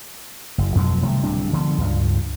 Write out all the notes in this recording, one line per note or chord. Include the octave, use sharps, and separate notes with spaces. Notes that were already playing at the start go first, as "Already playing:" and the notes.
F#1
F2 B2 F#3 G#3
C3 D#3 G3 A3
D1 G3 C4 D4
D3 F3 G#3 B3
C#2 G2